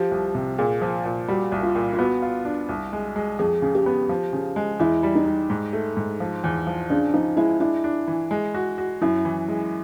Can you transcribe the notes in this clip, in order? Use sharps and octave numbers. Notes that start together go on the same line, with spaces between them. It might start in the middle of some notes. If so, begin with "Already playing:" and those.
Already playing: F3 G4
C2
C3
A#2 G#4
F3
A#2
G3 F#4
C2
F4
A#2
F4
B3 F#4
F4
D4
C2
G#3
G#3
F2 G#4
C#3
G4
B3
F3
C#3
G#3
E2 E4
G3
D#4
G3
G#2
A3
G#2
F3
E2
F3
C#3 D4
F3 D#4
G#3 E4
D4 E4
D4
E3
G#3
F#4
F#4
F#2 E4
E3
G#3